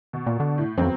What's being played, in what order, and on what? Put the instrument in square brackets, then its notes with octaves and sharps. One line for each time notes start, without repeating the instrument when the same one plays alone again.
[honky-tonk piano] B2
[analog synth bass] A#2
D3
[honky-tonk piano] A2
[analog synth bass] F2 [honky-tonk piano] F#3 B3 C4